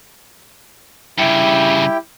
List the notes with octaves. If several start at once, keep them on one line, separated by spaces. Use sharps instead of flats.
G2 C#3 E4 G4 G5